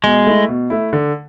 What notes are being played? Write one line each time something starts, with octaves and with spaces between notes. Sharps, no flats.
B2 G#3
A3 E4
B2
A3 E4
D3